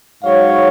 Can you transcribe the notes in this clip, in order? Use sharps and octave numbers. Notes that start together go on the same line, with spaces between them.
G#2 F#3 C#5 F5